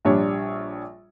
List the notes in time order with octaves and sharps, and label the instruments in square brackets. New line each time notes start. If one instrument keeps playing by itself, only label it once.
[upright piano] A#1 G3 D4 C#5